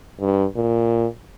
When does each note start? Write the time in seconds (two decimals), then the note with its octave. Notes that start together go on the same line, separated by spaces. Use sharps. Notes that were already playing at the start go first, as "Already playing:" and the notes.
0.20 G2
0.56 A#2